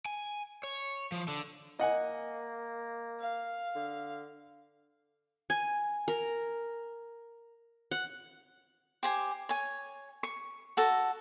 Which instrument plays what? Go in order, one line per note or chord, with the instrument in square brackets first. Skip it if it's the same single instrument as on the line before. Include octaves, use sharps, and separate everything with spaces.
[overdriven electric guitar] G#5
C#5
F3
D3
[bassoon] A#3 [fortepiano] D#5 F#5 G#5
[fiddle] F5
[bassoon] D3
[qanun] G#5
A#4
F#5
[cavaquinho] G4 C5 G#5
C#5 G#5
C#6
F#4 A4 A#5